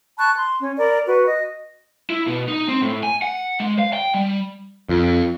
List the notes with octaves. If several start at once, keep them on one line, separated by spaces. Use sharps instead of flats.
A5 B5 C#6 F#6
C6
C#4
A#4 D5 B5
F#4 B4
D#5
E4
B2
D#4
C4
A2
G#5
F#5
G#3
F5
G5
G3
F2